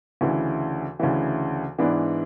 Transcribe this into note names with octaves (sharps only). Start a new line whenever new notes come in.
D2 C#3 E3
D2 C#3 E3
G#2 E3 B3 D4